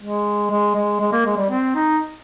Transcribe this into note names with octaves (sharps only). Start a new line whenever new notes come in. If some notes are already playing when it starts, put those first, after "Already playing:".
G#3
G#3
G#3
G#3
A#3
G#3
G3
C4
D#4